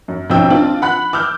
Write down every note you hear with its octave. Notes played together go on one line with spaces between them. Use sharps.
F#2
B1 F3 C#4 G5 E6
C4 D4 F4
F#5 B5 F#6
D6 E6 F6 G6